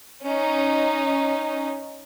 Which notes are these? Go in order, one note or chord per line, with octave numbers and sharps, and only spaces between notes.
C#4 D#4